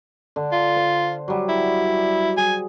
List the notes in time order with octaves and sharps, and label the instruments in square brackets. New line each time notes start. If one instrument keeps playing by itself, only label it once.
[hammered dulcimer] D3
[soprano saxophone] F4
[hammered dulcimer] C5
F#3 G3
[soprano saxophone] E4
[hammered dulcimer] G#4 [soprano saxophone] G#5